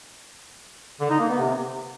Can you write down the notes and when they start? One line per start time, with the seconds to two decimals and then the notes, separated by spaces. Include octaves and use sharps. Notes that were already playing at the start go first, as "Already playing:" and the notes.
1.00 D3
1.10 D#4
1.19 A#3
1.29 B3
1.39 C3